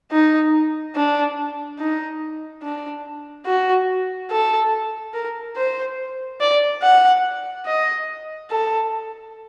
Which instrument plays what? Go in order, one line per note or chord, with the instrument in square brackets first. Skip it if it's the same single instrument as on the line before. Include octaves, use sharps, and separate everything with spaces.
[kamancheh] D#4
D4
D#4
D4
F#4
A4
A#4
C5
D5
F#5
D#5
A4